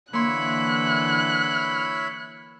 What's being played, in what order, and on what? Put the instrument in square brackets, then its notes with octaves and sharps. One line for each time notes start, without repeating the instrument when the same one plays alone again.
[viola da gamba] D3 E3 [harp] A#3 C6 [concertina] E4 C#5 B5 [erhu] F#6